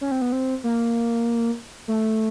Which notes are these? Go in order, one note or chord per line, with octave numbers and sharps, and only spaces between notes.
C#4
C4
B3
C4
A#3
A3